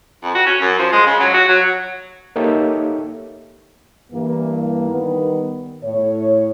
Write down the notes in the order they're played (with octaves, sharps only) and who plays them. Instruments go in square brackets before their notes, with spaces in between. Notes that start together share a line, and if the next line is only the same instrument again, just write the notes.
[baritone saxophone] F2
F#4
C#4
F#2
F3
G#3
C#3
F#3
F#4
F#3
[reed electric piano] A#3 D#4 G4 A4 C#5 E5
[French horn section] G2 E3 A#3
D#3 G3 B3
A2 C#5